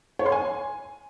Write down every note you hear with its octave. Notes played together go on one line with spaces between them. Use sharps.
C#5
C6
G#5